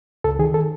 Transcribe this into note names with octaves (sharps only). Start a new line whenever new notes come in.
C#2 A4
D#3 G#4
A4